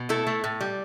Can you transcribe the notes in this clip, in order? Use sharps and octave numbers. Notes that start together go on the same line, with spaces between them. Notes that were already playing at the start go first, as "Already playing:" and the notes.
Already playing: B2
A3 E4 A4
A3
A2
G3